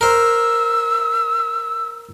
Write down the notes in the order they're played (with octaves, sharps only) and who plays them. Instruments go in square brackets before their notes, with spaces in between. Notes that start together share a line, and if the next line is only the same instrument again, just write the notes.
[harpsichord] A#4 C5 [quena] E6